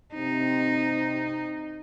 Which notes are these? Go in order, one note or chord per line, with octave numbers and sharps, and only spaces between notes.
C3 C4 D#4